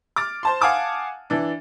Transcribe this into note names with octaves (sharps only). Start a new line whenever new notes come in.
D6 F6 A6
C5 A5 C6
F5 F#5 G#5 A5 D6 D#6
E3 D4